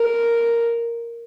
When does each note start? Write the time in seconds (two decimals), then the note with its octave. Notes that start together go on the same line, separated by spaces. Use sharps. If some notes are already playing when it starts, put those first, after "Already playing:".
Already playing: A#4